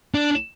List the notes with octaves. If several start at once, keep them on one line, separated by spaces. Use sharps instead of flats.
D4